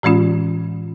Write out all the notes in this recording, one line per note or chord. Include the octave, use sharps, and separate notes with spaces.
A2 E3 G#3 C#4 F4